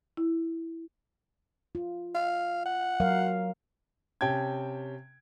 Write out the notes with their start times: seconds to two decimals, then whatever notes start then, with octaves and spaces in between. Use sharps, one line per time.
0.17 E4
1.75 F4
2.15 F5
2.66 F#5
3.00 F#3 A#4 F5
4.21 C3 C#4 G5 A5 G#6